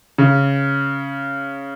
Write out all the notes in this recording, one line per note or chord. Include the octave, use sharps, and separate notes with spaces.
C#3